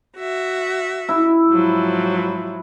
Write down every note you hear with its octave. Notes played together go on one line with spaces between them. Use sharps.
F#4 E5
E4
G#2 F3 F#3